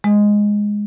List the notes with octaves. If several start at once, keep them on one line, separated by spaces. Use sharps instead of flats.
G#3